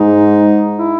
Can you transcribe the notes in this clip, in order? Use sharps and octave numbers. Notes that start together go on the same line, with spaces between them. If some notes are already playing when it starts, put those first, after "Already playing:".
Already playing: G#2 D#4
E4